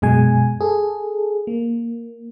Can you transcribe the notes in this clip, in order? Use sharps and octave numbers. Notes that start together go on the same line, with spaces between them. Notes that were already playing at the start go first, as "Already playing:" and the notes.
F#2 B2 G#3 G#5
G#4 A4
A#3